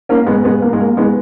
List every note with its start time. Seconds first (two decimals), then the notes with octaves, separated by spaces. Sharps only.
0.09 A#3 C#4
0.27 G#3 B3
0.44 G#3 B3
0.62 A#3
0.73 G#3
0.80 A#3
0.97 G#3 B3